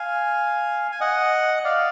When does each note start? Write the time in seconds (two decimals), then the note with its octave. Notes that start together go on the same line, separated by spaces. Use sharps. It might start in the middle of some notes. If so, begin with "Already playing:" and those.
Already playing: F5 G#5
0.92 G#5
1.01 D#5 F#5
1.64 D5 F5